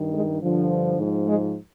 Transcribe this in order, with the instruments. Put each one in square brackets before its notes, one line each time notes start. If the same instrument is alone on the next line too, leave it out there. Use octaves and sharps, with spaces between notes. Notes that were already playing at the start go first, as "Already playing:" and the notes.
Already playing: [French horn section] G2 D#3
G#3
G2 D3 F3
G#2 F3
G#3